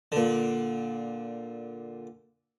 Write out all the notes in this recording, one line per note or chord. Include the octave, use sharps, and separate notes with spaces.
A#2 D3